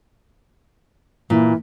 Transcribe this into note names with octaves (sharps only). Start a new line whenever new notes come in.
A#2 E3